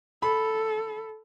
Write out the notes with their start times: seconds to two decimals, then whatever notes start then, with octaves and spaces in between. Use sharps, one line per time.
0.22 A4 B5